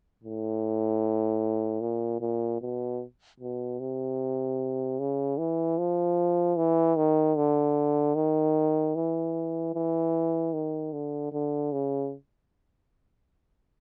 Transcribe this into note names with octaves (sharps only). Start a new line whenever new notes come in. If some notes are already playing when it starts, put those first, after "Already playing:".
A2
A#2
A#2
B2
B2
C3
C#3
E3
F3
E3
D#3
D3
D#3
E3
E3
D#3
D3
D3
C#3